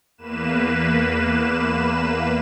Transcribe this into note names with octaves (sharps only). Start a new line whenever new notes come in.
E2 A#3 B4 E7